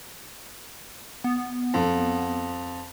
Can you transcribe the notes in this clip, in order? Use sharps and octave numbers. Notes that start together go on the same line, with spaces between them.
B3
F2